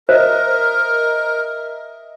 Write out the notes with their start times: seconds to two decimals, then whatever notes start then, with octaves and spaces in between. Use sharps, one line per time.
0.09 A#4 C5 D#5 E5